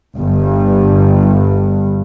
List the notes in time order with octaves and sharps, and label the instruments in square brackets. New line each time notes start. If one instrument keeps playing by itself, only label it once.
[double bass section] G1 G2